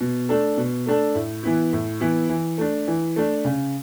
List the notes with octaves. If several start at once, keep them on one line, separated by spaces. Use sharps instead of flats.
B2
A3 D4 A4
B2
A3 D4 A4
A2
E3 B3 E4
A2
E3 B3 E4
E3
A3 D4
E3
A3 D4
C#3